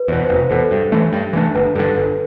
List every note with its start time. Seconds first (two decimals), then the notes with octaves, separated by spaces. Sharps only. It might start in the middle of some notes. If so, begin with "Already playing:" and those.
Already playing: B4
0.08 E2 B2 C5
0.24 C5
0.29 F1 B4
0.40 C5
0.50 E2 B2 A4
0.61 A4
0.71 G2
0.92 E3 A3 D4
1.13 G2
1.33 E3 A3 D4
1.55 G1 B4
1.75 G2 D3 A4
1.96 G1 B4